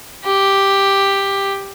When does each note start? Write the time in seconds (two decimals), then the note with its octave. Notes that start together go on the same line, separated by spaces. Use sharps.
0.25 G4